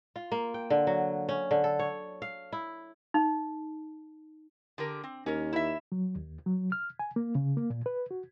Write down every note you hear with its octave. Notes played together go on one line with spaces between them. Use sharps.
F4
A#3
G5
D3
F#3
C#4
D3
A4
C#5
F5
E4
D#4
D3 G4 A#4
C4
D#2 C#4 A#4
E4 E5
F#3
D#2
F#3
F6
G#5
A#3
C#3
A#3
A#2
B4
F#4